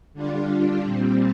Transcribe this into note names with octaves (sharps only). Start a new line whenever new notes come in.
D3 G3 D4 F4
A#2 G3 C4